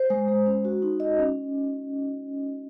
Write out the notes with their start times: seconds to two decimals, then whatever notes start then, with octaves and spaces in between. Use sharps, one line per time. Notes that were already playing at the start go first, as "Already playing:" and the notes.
Already playing: C5
0.10 G#3
0.28 G#3
0.46 C#4
0.65 F#4
0.82 D#4
1.00 D#5
1.19 C#4